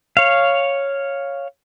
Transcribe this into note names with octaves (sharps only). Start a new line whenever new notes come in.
C#5 F5